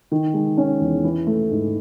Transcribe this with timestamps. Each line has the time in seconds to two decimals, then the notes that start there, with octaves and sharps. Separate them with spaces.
0.12 D#3
0.34 G#3
0.58 C#4
0.81 E2
1.04 E3
1.27 A3
1.50 G#2